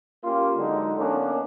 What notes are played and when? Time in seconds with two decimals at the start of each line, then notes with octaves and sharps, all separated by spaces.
0.24 A#3 C#4 F4 G4
0.57 D3 F#3 G#3 D#4
0.98 A#3 B3 C#4 D4